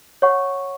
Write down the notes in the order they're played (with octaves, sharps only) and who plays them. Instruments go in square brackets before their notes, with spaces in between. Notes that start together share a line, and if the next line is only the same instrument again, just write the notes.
[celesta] C#5 F#5 C#6